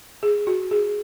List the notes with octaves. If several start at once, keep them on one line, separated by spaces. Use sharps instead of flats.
G#4
F#4
G#4